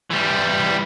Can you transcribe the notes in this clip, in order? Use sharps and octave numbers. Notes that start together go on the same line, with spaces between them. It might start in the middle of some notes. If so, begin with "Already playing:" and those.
E3 G3